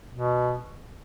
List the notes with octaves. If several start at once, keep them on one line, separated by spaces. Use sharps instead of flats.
B2